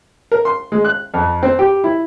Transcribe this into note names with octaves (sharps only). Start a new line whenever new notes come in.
A#4
C6
G#3
F#6
F2
C4
G4
E4